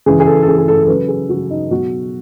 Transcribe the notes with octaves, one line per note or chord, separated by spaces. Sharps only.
C#3 E3 G#4
G#4
A4
A4
C#3 E3 G#4
G#4
A4
A4
C#3 F#3 B4
G#4
C#3 F#3 F#4
D#4
B2 F#3 F#4